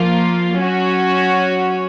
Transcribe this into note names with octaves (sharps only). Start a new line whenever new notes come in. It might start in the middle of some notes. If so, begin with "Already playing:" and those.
Already playing: F3 A#3 F4
F#3 C#4 F#4 C#5